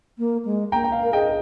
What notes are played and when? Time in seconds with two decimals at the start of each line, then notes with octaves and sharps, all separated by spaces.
0.18 A#3
0.45 G#3
0.72 A#3 G5 A#5
0.84 G5
0.92 F5
1.03 A#4
1.13 G#4 D#5 G5